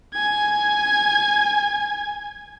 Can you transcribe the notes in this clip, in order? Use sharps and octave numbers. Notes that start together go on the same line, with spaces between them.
G#5 G#6